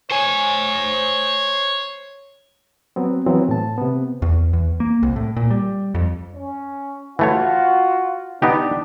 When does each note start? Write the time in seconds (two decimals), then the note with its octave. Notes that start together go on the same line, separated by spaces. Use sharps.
0.11 C5 C#5 G#5
2.96 F#3 B3 C4
3.27 E3 F#3 B3 C4
3.49 A2 A5
3.78 C3 B3
4.22 E2
4.53 E2
4.80 A#3
5.03 C2
5.16 A2
5.36 A#2
5.51 G3
5.94 F2
6.35 C#4
7.19 E3 A3 F4 F#4 C#5
8.42 B3 D4 D#4 G4